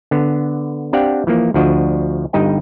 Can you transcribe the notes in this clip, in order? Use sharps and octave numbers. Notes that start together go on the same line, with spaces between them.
D3 B3
C4 D4 G4 D5 F5 F#5
E3 F3 A#3
D2 D3 F3 D4 F#4 D#5
G1 G2 D#4 D#5 G5